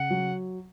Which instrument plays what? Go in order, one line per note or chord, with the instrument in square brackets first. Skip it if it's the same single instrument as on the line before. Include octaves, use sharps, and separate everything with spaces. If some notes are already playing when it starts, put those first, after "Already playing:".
Already playing: [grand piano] C#3 [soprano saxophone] F#5
[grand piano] F#3